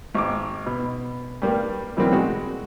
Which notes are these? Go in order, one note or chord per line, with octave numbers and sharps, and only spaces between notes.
G#1 D6
B2
G2 G3 A#3
B2 E3 F#3 G3 A#3 C4
G#3 F#4